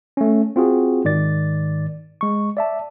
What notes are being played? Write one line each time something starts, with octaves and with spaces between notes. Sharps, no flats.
A3 C#4
C4 F4 F#4 G#4
G#2 D#3 D5 A6
G#3 C#6
D5 E5 A5